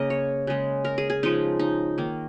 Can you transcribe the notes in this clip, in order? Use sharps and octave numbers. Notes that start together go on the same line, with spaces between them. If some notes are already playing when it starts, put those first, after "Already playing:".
Already playing: C#3 A#3 A#4 D#5
C#5
C#3 G#3
A#4
G#4
G#4
C#3 F3 G#3 D#4
D#4
D#3 A#3